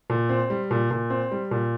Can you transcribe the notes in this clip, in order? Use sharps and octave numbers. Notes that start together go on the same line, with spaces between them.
A#2
C4
G3
A#2
A#2
C4
G3
A#2